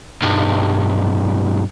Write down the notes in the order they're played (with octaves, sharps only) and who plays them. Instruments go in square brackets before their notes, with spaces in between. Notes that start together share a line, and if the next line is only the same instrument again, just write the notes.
[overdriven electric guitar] B1 G2